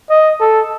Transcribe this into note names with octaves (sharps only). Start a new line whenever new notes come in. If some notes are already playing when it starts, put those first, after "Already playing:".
D#5
A4